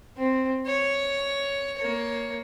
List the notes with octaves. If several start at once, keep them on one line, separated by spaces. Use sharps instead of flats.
C4
C#5
A#3 C#5